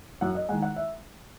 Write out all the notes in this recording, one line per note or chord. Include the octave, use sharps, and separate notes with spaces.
F#2 F#5
D#5
D#3 G#3 F#5
F#5
E5